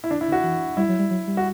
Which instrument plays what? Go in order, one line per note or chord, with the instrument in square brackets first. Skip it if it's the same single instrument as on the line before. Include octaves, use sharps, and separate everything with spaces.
[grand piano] E4
[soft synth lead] D3 [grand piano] D4
[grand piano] E4
[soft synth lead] D3
[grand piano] F#4
[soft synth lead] E3
[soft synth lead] G3 [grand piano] E4
[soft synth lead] F#3
G3
F#3
G3
[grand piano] F#4